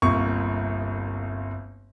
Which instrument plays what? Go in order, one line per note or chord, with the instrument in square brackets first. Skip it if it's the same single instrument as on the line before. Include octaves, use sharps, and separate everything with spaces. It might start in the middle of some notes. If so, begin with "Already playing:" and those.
[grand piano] G1 C2 A#3 C#6